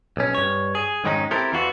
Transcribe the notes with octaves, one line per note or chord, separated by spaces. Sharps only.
B1 C#4
G2 C#5
G#4
F2 G#2 D#3 G#3 C#4 D#4
C4 E4 G4 A4 A#4
E2 E3 F4 F#4